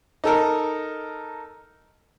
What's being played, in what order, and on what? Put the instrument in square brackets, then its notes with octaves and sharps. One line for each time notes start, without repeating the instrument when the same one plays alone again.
[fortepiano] D#4 A4 A#4